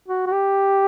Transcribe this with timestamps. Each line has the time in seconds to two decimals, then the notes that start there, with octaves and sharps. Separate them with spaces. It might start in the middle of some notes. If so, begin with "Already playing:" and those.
0.08 F#4
0.26 F#4
0.32 G4